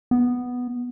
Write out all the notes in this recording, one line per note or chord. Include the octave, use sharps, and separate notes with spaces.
B3